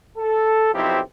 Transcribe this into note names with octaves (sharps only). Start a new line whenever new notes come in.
A4
B1 F3 C4 D#4 E4 G4